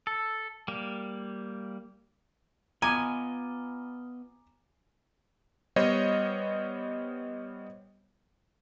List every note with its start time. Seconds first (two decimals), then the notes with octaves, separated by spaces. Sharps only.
0.07 A4
0.68 G3 A#3
2.82 B3 F4 D#5 G#5 A#5 D6
5.76 G3 B3 C5 C#5 D#5